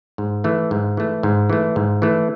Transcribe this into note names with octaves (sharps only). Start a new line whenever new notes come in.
G#2
E3 A3
G#2
E3 A3
G#2
E3 A3
G#2
E3 A3